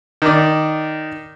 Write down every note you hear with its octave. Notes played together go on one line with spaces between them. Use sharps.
D#3 D5